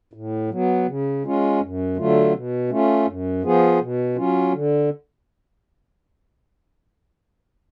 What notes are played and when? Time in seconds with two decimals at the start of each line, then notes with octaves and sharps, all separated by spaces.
0.13 A2
0.50 F#3 B3
0.87 C#3
1.24 G#3 C#4 F4
1.61 F#2
1.96 D3 F#3 A3 F4
2.34 B2
2.70 A3 C#4 F4
3.06 F#2
3.43 F3 B3 F4 G#4
3.80 B2
4.16 F#3 C#4 F4
4.53 D3